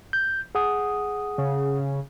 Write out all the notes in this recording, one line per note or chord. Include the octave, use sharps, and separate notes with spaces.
G6
G#4 F#5 D#6
C#3